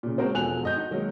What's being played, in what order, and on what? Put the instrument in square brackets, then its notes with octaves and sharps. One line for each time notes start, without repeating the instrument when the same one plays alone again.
[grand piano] A#2 C#3
G#3 C4 F#4 A#4 C5
E1 F3 A4 G#5 F#6 F7
G#1 D#5 G6
D#4
D#3 F#3 G#3 A#3